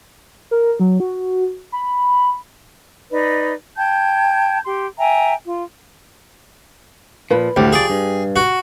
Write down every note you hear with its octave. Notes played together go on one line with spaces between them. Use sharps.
A#4
F#3
F#4
B5
D#4 B4 D5 D#5
G5 A5 G6 G#6
G4 C6
E5 G5 G#5 A#5
F4
A#2 F3 B4 B5
D2 A2 G3 G4
F3 G#4 D5
G2
F#4